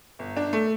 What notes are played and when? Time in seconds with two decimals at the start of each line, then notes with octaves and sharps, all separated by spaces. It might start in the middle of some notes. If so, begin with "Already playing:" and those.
0.19 G1
0.37 D4
0.53 A3